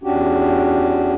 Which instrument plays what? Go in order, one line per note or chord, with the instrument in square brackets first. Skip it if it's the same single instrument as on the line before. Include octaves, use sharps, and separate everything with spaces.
[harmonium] E2 C#4 D4 F#4 G4